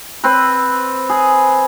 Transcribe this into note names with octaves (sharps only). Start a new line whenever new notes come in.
C4 B4
G#4